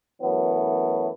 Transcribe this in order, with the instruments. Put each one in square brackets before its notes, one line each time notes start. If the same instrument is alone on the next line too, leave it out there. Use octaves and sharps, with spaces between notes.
[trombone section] F#2 E3 F#3 A3 B3